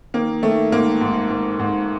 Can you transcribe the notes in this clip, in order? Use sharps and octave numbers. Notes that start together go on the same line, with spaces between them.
D#3 A#3
D#3 A3
G#2 A#3
G#2
G#2
G#2